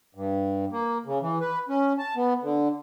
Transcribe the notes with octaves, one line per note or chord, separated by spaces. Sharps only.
G2
A#3
C#3
E3
B4
C#4
A5
B3
D3